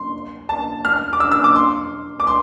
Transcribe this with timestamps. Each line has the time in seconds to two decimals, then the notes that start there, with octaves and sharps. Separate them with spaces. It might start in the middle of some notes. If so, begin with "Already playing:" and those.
Already playing: C6
0.49 A5
0.85 F6
1.13 D6
1.20 E6
1.32 E6
1.44 D6
1.55 C6
2.20 D6
2.27 C6